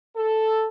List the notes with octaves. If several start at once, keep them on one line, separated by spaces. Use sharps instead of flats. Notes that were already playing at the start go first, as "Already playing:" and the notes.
A4